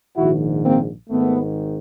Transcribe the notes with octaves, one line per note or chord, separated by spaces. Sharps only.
A#1 G#2 D#3 E4 F#4
A#3 C4
G#1 G#2 D#3 A3 B3